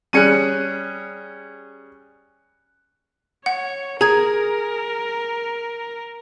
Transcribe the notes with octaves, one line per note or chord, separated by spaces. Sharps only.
G3 C#4 G#4 F#6 C#7 D#7
C#5 F#5
G#4 A#4 A#5 G#6